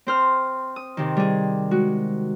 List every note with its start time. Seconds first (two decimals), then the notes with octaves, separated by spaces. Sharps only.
0.07 C4 C5 F6
0.76 D#6
0.97 C3 D#3
1.17 G3 G#4
1.71 G#3 F#4